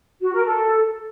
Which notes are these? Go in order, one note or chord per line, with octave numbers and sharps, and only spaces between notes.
F#4
A#4
A4